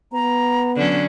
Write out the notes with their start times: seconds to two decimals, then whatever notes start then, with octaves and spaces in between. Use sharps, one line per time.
0.13 B3 A#5
0.76 D3 F#3 C#4